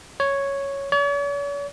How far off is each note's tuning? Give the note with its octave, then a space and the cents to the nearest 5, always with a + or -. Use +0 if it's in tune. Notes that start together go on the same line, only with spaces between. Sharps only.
C#5 +0
C#5 +45